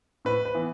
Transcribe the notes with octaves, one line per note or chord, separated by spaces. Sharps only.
A2 B4
B4
E3 B3